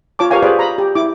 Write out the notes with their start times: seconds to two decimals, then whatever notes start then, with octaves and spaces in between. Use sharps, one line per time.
0.19 F4 C#5 A5 D6
0.31 G4 A#4 B4 C#5 F5 G#5
0.43 G4 G#4 B4 C5 D5 F5
0.59 A#5 B5
0.78 G4
0.95 E4 D6